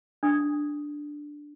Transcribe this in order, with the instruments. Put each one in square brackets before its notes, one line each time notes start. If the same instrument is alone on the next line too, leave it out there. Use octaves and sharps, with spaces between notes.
[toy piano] D4 D#6